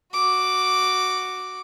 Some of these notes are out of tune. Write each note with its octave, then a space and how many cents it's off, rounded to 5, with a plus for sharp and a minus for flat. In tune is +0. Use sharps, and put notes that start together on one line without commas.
F#4 +0 D6 +0